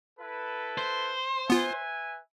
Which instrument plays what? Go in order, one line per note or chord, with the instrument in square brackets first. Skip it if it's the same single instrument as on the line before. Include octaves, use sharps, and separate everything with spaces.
[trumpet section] E4 A4 B4
[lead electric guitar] C5
[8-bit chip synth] B3 F4 [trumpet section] B4 E5 G#5